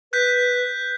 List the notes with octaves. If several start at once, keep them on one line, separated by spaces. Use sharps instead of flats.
B4 F#6 G6 B6